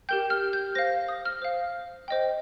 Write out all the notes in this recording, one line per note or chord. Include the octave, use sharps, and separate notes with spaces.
G4 A#4 G5 G6
F6
G6
C5 F5 A#6
D#6
F6
C5 F5
C5 D#5 G5